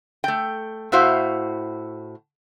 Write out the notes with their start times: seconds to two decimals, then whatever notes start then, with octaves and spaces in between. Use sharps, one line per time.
0.24 A3 G5
0.92 A2 E4 F#4 C5 F5